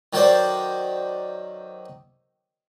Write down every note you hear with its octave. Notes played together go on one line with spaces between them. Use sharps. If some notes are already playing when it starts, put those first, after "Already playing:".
D#3 F#3 A4 C5 D5